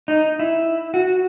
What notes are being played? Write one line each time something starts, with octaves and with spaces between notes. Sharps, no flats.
D#4
E4
F#4